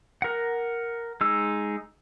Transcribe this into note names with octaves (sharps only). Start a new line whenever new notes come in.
A#4 F#5
G#3 D#4 E6